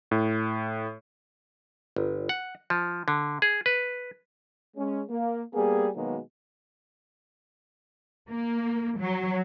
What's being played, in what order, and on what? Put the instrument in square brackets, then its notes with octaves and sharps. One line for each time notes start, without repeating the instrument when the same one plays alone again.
[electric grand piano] A2
[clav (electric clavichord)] G1
F#5
F3
D3
G#4
B4
[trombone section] G#3 C#4
A#3
G3 A#3 B3 G#4
B2 D#3 F#3 G#3 A#3 B3
[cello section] A#3
F#3